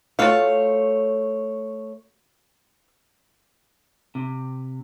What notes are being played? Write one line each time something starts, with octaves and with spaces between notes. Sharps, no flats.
A3 F4 F#4 C5 C#5 F5
C3